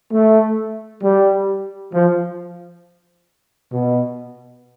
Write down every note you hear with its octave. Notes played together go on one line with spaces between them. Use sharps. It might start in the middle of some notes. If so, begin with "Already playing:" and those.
A3
G3
F3
B2